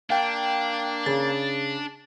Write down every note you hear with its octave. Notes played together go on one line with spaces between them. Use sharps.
A#3 D4 F5 G5
C#3 A6